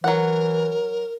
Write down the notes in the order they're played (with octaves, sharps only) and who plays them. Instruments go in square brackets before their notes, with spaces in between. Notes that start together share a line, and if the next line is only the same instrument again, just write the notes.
[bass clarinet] E3 [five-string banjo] F#3 F#5 [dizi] A#4